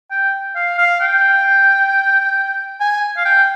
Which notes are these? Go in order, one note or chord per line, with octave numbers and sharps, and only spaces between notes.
G5
F5
F5
G5
G#5
F5
G5